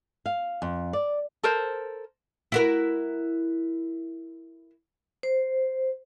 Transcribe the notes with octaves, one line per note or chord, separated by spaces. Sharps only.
F5
F2
D5
A4 A#4 C5
E4 F#4 A#4
C5